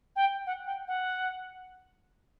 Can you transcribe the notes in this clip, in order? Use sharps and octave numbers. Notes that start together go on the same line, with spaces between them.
G5
F#5
G5
F#5